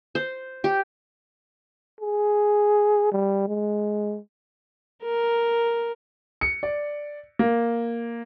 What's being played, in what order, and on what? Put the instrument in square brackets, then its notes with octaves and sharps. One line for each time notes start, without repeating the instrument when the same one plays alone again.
[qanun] C5
G4
[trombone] G#4
G3
G#3
[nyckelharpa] A#4
[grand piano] C#7
D5
A#3